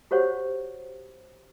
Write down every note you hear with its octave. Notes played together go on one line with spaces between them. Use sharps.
F#4 G4 C5 C#5 F#5